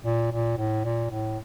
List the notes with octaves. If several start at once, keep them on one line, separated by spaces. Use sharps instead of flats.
A#2
A#2
A2
A#2
A2